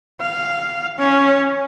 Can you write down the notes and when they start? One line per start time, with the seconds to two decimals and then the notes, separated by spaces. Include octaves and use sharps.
0.21 F5
0.98 C#4